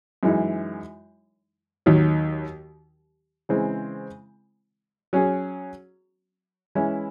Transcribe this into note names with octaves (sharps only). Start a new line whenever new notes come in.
F#2 E3 G#3 D#4
D#2 D#3 F#3
C#3 E3 G#3 C4
F#3 C#4 G#4
E3 G#3 C#4 E4